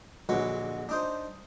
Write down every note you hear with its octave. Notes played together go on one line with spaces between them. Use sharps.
A#1 D3 F#3 G#3 B4 C#6
D4 D#4 C5